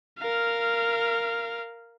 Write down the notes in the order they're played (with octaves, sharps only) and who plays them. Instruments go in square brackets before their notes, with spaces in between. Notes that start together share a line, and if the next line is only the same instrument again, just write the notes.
[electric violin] A#4 F5